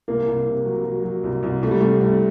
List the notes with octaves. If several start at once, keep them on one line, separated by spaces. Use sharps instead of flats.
C2 A#3
C2
C3
F#3
F#3
F#3
C2
C2
C2 A3
G3
C3 A3
C2